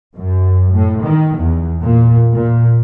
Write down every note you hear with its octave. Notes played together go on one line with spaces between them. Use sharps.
F#2
A2
D#3
E2
A#2
A#2